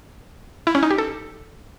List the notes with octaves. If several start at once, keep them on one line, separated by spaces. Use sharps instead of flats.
E4
C#4
D#4
G4
A4